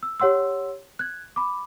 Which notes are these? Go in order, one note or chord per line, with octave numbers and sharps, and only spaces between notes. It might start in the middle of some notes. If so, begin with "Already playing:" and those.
E6
G4 C#5 F#5 C6 E6
F#6 G#6
B5 D6